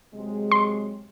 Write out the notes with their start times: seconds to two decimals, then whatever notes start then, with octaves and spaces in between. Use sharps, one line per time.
0.14 C3 F#3 G#3
0.51 C6